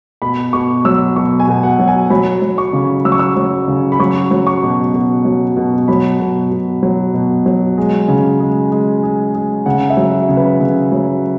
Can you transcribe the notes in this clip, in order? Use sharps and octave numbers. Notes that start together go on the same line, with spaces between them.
B2 B5
B2 C#6
F#3 E6
B2 C#6
G#5
B2
F#5
F#3
G#5
F#3 B5
F#3
C#6
C#3
F#3 E6
C#6
E6
F#3
C#3
B5
F#3 C#6
F#3
C#6
B2
B2
F#3
B2
F#3 B5
B2
B2
F#3
B2
F#3
G#3
C#3
G#3
G#3
G#3
G#3
C#3 F#5
E5
F#3
C#3
B4
C#3
F#3